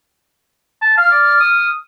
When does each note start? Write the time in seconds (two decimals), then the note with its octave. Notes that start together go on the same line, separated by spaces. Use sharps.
0.82 A5
0.98 F5 F6
1.11 D5
1.40 D#6